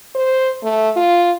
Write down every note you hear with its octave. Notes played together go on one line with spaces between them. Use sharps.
C5
A3
F4